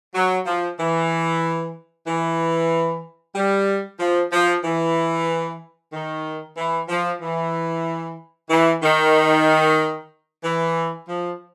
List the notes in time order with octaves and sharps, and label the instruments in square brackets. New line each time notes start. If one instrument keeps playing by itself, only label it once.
[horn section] F#3
F3
E3
E3
G3
F3
F3
E3
D#3
E3
F3
E3
E3
D#3
E3
F3